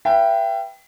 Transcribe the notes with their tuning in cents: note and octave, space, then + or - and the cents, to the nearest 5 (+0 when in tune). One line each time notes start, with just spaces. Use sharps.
B4 -20 E5 +35 G5 -5